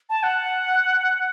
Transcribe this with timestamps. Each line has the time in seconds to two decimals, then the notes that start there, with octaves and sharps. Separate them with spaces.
0.10 A5
0.23 F#5